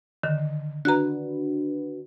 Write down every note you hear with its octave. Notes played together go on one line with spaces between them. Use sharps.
D3 D#3
D4 F#4 B4 A#5 F#6